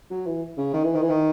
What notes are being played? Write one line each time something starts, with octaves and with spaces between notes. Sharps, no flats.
F#3
E3
C#3
D#3
E3
D#3
E3
D#3